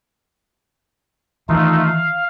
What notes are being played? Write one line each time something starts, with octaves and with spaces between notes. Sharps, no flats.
D#3 E3 A3 D#4 F4
F5